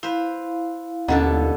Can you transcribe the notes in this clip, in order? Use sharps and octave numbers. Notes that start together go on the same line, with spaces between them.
E4 B4 C5 F5
D#2 B2 D3 C#4 A4 D#5 F#5